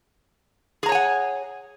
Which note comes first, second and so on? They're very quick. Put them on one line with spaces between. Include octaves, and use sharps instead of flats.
G#4 A#5 C#5 G#5 F#5